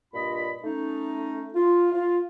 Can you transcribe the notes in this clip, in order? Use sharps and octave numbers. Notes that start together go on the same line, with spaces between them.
G2 A#2 F4 D#5 B5
A3 C#4 D#4
F4
F4